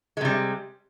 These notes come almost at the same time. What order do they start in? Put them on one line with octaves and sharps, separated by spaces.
G#3 C3 G3